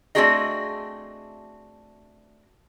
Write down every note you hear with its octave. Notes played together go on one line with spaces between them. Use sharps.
A3 C4 D4 F#4 G#4 D#5